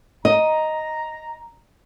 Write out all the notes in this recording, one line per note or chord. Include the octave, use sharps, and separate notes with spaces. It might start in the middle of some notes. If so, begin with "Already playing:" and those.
D#5 A#5